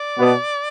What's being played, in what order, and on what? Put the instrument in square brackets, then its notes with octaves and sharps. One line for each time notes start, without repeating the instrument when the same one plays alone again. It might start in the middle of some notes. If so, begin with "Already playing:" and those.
Already playing: [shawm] D5
[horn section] B2 B3